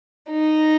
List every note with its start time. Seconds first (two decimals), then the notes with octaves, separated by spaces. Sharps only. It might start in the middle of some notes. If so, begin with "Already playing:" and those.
0.31 D#4